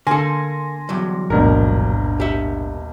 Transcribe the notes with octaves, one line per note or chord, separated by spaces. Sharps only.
D3 A#3 A4 G#5 C6 A#6
E2 G2 F#3
D#1 A1 G#2 B2 D4 A#4
G4 E5